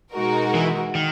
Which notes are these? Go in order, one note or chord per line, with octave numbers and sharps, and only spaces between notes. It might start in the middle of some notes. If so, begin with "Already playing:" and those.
B2 G#3 D#4 F#4 A#4
E3
D#3